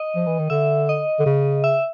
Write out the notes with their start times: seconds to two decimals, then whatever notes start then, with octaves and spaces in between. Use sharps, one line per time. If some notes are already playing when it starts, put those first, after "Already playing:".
Already playing: D#5
0.16 F3
0.27 E3
0.39 D#3
0.50 D3 E5
0.89 D#5
1.20 D3
1.26 C#3
1.64 E5